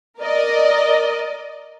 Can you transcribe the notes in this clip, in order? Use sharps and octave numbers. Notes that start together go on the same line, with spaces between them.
A#4 D5 D#5